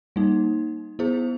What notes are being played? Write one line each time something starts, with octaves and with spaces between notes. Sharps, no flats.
G3 A#3 D#4
B3 E4 G#4 C5